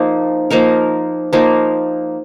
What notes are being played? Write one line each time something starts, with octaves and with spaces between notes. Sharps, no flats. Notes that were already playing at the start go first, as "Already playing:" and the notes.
Already playing: F3 A#3 D#4
F3 A#3 D#4 A#4
F3 A#3 D#4 A#4